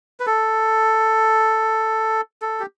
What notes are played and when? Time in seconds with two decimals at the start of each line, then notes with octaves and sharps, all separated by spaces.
0.20 B4
0.27 A4
2.42 A4
2.60 G4